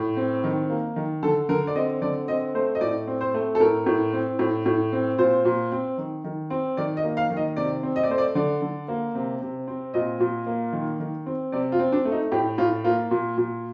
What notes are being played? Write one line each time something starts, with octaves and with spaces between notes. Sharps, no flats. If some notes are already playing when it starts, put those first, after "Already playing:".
Already playing: A2
C4
D#3
A#3
D#3
D3 A4
D3 A#4
D5
C4 D#5
D3 D5
C4 D#5
A3 C5
D#5
A2 D5
C4
C5
A3
A4
A2 A#4
A2
C4
A2
A2
C4
A#2 C5
A#2
C4
D#3
D#3
C4
D#3 D5
D#5
A#3
F5
D#3
D#5
C3 D5
C4
D#5
D5
A3 C5
D5
D3 D5
D3
A#3
C3
C3
C4
A#2 D#5
A#2
A#3
D#3
D#3
C4
C3 D5
F4
C4
D4
A3
D#4
A2 G4
A2 F4
A#3 F4
A#2
A#2